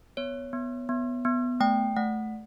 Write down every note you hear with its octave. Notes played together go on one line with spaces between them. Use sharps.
B3 C#5
B3
B3
B3
A3 G5
A3 F#5